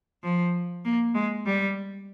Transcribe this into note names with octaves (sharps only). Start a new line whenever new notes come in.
F3
A#3
G#3
G3